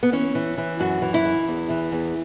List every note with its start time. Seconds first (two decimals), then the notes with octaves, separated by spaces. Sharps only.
0.03 B3
0.12 E3 C#4
0.35 E3
0.58 E3
0.80 F#2 F#4
1.02 E3
1.14 E4
1.25 E3
1.48 E2
1.70 E3
1.92 E2